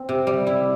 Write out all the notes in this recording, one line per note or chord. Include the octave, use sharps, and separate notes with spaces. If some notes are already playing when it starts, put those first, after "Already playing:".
Already playing: C4
C3
G3
E4